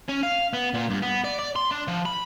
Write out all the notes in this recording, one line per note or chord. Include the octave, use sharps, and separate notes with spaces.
C#4
F5
B3
A#2
G2
B3
D5
D5
C6
D4
F3
B5